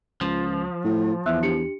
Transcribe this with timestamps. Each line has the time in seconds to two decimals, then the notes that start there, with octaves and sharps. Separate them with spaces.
0.21 C#2 F3
0.85 A2
1.26 E2 E5 E6 F#6
1.43 D4 G4 C#7